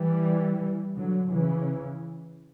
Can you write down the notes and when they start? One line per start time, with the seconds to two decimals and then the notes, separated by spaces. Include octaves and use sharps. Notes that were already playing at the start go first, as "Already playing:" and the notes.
Already playing: E3 G3
0.96 D3 F#3
1.31 C#3 E3